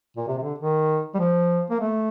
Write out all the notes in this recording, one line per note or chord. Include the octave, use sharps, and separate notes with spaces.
A#2
C3
C3
D3
D#3
G3
F3
A#3
A3